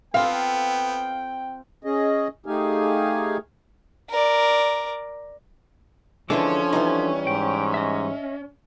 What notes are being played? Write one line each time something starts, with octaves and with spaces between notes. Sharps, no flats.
B3 C4 F4 A4 F5 G5
C#4 G#4 D#5
A3 D#4 G4 G#4 F5 G#5
A#4 D5
D3 E3 F3 G#3 C#4 D4 A4 D6
E3 G3 D#4
G#2 G5
D#5 E5